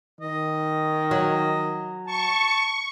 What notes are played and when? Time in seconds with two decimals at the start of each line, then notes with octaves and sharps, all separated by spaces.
0.21 D#3 D#5
1.11 F#3
2.07 A5 C#6